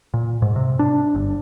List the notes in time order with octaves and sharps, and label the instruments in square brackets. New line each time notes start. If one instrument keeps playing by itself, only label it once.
[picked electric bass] A#2
G#2
C3
D4
G1